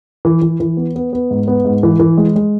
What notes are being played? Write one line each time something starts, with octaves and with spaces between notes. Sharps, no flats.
E3
E3
E3
B3
B3
B3
G#2
B3
G#2
E3
E3
G#3
G#3